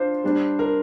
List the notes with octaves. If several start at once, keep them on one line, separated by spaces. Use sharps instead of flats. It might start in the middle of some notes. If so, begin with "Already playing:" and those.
Already playing: D4 F4 C5
G3 D4 G4
A#4